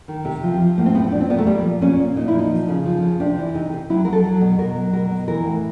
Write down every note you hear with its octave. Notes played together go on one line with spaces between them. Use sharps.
D#3
C3
F3
F3
A2 A#3
C4
F3 B3
C4
A#2 D4
C4
A#2 B3
A3
A#2 G3
F3
A#2 C#4
A#2
A#2 D#4
E4
F3
D#4
F3
C#3
F3
C#3
C3 D4
E3
C3 D#4
C3
F#3 E4
F#3 A#4
A4
F#3
B2
B2 A#4
F#3
B2 A#4
B2
E3 A#4
A2